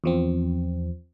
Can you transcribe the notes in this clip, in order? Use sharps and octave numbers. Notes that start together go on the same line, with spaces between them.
E2 F3 C4